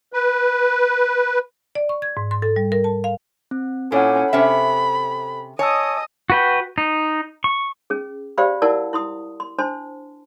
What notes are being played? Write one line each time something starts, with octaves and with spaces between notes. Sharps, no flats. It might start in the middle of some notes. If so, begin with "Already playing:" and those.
B4
D5
C#6
G#6
G#2
C6
A4
G3
A#4
A5
F5
C4
A#2 C#4 E4 A4 C#5 F#5
C3 C#4 A4 C5 E5 B5
C#5 D#5 G#5 A5 D#6 E6
F#4 B4 G5
D#4
C#6
C#4 G#4
G4 C5 D5 F5 G5 B5
E4 A#4 D5 F#5 A5 E6
E4 C6 D#6
C6
D4 C5 A5 C6